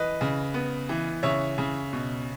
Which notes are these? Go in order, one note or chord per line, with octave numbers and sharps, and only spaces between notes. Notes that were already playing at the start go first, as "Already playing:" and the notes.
Already playing: E3 B4 D#5
C#3
B3
E3
C#3 C#5 E5
C#3
B2